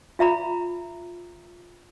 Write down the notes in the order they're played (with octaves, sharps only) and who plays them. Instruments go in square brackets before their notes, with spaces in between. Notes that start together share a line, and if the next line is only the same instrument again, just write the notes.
[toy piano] F4 E5 A#5 B5